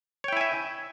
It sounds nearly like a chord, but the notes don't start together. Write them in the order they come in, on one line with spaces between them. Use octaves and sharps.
C#5 G5 E4 G#5 E5